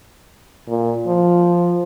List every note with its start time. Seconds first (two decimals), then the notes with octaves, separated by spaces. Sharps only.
0.68 A#2
1.07 F3